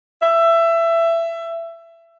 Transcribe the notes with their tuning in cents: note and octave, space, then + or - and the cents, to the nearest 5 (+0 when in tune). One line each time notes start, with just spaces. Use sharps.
E5 +20